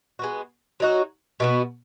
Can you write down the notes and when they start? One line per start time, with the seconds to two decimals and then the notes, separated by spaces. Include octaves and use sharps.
0.19 G#3 B3 F#4
0.80 F#3 D#4 F#4
1.40 B2 B3 F#4